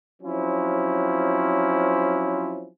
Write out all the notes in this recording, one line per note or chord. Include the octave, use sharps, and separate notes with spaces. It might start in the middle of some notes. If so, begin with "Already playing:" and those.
F3 F#3 C4 C#4 E4